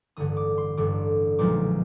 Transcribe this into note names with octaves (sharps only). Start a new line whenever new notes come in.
A1 G2 D3 D#6
D6
C6
A1 G2 D3 D6
B1 A#2 F3 G#3 D6